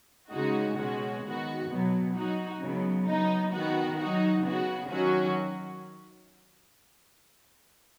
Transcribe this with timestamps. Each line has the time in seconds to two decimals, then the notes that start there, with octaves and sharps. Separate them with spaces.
0.32 C#3 G#3 D#4 F#4
0.78 B2 G#3 C#4 F#4
1.24 D#3 B3 F#4
1.70 B2 F#3 B3
2.15 F#3 D#4 F#4
2.61 C#3 F#3 B3
3.07 F#3 B3 D#4
3.53 D#3 B3 F#4
3.99 F#3 D#4 F#4
4.45 C#3 B3 F#4
4.91 D#3 F#3 C#4 F#4